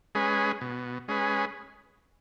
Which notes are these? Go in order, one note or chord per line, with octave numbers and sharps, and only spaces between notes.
G#3 C#4 G#4 B4
B2
G#3 C#4 G#4 B4